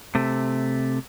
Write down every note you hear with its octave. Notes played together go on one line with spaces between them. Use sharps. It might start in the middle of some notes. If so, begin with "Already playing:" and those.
C3 A3